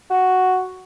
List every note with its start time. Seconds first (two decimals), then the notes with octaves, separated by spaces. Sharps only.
0.10 F#4